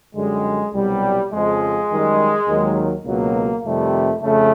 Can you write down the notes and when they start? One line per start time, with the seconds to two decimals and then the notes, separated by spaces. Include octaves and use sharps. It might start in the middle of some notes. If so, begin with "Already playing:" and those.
0.15 F#2 D3 G3 G#3
0.73 C2 B2 F#3 G3
1.32 F2 C#3 F3 G#3
1.90 F#2 D#3 G3
2.48 D#2 D#3 F#3
3.06 C#2 B2 F#3 A#3
3.64 F2 C3 D#3 G3 A3
4.22 F2 C#3 A3